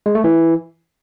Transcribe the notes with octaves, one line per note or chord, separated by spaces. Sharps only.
G#3
A3
E3